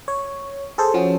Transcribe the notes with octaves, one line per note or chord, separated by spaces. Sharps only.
C#5
G#4 A4 C5
F3 C#4 F#4